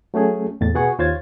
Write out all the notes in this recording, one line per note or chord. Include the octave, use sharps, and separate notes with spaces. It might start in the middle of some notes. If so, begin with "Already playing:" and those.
F#3 A3 C#4 G#4
E2 A2 A6
B2 B3 G#4 F#5 G#5 C#6
D#2 F4 C5 C#5 G#6 A6